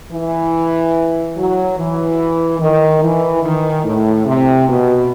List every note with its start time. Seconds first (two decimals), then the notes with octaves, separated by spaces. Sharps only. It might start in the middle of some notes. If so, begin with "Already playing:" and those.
0.11 E3
1.36 F#3
1.78 E3
2.60 D#3
3.02 E3
3.43 D#3
3.84 A2
4.26 C3
4.68 B2